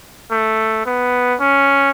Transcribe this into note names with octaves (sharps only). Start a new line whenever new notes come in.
A3
B3
C#4